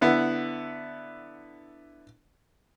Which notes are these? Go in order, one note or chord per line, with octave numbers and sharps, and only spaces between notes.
D3 B3 E4